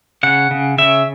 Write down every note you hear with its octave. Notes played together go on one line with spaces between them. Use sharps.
C#3 F#5
C#3
C#3 E5